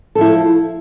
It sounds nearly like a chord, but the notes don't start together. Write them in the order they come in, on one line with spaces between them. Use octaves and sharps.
A4 F3 E4